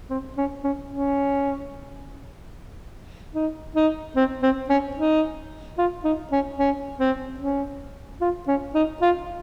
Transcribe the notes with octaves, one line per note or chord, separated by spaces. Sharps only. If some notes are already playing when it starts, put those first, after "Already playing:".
C4
C#4
C#4
C#4
D#4
D#4
C4
C4
C#4
D#4
F4
D#4
C#4
C#4
C4
C#4
F4
C#4
D#4
F4